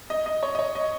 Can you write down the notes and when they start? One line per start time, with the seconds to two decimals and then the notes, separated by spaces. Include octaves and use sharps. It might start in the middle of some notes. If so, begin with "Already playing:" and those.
0.10 D#5
0.26 D#5
0.43 C#5
0.55 D#5
0.59 C#5
0.75 D#5